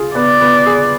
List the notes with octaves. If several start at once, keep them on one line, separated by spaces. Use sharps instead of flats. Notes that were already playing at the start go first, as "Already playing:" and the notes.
Already playing: F4 G#4
B3 D5
B3
G#4